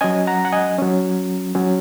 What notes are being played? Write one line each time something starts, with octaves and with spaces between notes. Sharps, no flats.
F#3 C#4 D#5 G#5
F#5 A#5
F#5
D#5 G#5
F#3 C#4
F#3 C#4